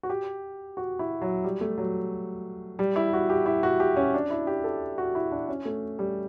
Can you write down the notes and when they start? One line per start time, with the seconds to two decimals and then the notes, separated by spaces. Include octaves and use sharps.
0.03 F#4
0.10 G4
0.77 F#4
0.99 E4
1.22 F#3
1.44 G3
1.61 A3
1.78 F#3
2.79 G3
2.96 E4
3.13 F#4
3.30 G4
3.46 E4
3.63 F#4
3.80 G4
3.97 C#4
4.14 D4
4.30 E4
4.47 G4
4.64 A4
4.98 F#4
5.15 E4
5.31 D4
5.48 C#4
5.65 A3
5.99 G3